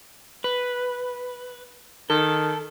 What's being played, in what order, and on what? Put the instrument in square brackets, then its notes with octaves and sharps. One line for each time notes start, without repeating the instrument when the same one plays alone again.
[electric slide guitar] B4
[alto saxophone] D#3 [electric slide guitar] A4